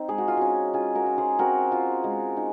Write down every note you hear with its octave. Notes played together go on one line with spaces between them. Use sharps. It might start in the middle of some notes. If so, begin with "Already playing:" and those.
Already playing: C4 D#4
G#3 G#4
F#4
F4
C#4 F#4
C#4 F4 G#4
F#4 A#4
F4
G#4 C5
C4 F#4 A#4
F4
G#3
D#4